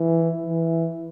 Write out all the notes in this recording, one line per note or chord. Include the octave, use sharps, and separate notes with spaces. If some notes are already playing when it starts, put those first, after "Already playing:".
Already playing: E3
E3